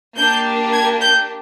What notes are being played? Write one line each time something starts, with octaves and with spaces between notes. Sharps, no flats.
A#3 D4 G4 G6
G#6
G6